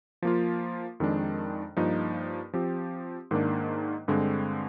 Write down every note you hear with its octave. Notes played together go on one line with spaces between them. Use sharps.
F3 A#3 F4
F2 D#3 G#3 D4
G2 F3 A#3 D#4
F3 C4 G4
G#2 D#3 A#3 D4
G2 D3 G#3 C4